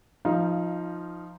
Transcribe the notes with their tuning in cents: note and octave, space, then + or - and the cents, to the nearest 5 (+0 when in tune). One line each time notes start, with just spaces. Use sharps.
F3 +0 D#4 +10 F5 -15